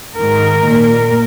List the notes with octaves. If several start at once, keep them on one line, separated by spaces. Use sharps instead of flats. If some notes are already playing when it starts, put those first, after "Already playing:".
G#2 D#3 A#4
A#2